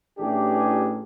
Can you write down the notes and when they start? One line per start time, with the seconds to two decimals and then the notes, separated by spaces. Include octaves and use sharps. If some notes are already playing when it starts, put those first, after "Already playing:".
0.17 A1 E3 D4 G4 G#4